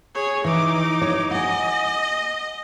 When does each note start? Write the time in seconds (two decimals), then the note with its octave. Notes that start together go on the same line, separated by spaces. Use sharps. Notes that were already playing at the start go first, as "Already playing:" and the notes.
0.14 G#4 C#5
0.45 E3 D#4 D6
1.02 C#5
1.31 D#5 F#5 G#5